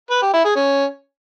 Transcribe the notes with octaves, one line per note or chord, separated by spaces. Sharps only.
B4
G4
E4
G#4
C#4